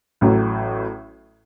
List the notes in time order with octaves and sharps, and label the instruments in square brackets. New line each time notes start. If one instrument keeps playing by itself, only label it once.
[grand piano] A1 A2 F#3